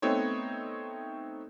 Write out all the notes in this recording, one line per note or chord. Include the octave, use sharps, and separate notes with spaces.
A3 B3 C4 D#4 C#5